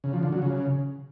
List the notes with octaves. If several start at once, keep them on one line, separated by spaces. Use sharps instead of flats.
C#3
F3
D3
F#3
C#3